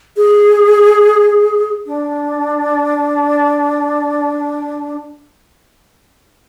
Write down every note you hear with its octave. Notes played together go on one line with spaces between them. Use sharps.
G#4
D4